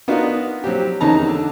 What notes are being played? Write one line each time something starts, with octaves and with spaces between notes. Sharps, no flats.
B3 D4 D#4 F4 F#4 A#4
F#3 C4 G4
E2 D#3 C#4 D#4 A5 A#5
D3